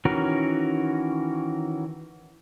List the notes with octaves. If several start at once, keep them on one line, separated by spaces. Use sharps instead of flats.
D#3 E3 C#4 F#4 A#4